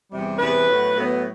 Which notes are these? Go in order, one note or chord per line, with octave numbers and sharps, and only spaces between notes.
E2 C3 G3
E2 C3 G3 B4
A2 F#3 B3
A2 F#3 B3